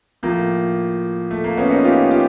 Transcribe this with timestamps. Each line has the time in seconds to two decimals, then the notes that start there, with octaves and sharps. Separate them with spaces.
0.23 A2 F3 A#3
1.31 A3
1.44 A#3
1.57 B3 C#4
1.70 C#4 D#4
1.84 F4 G4
2.11 F4 G4